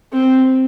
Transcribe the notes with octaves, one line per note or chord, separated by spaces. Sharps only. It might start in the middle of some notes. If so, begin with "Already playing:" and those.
C4